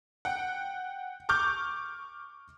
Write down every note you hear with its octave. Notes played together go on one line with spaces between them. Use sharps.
F#5 G5
C#6 D6 F6 G6